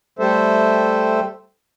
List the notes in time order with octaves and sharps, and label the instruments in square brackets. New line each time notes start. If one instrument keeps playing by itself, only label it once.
[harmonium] G3 A3 A4 C5 E5